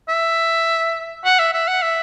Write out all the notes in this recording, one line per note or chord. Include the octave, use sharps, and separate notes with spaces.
E5
F#5
E5
E5
F#5
E5